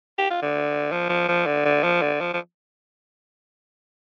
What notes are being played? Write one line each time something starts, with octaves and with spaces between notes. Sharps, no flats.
G4
F4
D3
F3
F3
F3
D3
D3
F3
D3
F3
F3